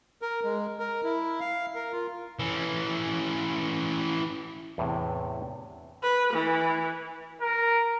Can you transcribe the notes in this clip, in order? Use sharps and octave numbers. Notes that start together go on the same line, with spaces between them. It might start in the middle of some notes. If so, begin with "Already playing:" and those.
A#4
G#3
A#4
E4
F5
A#4
F4
E3 C#4
E2 A2 C3
B4
E3
A#4